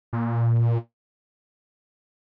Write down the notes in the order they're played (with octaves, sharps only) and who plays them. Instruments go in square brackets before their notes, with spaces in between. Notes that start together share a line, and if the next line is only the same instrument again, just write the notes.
[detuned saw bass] A#2